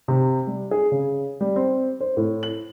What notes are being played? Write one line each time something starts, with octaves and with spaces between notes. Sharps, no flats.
C3
G3
G#4
C#3
G3
C4
C5
A2
F#7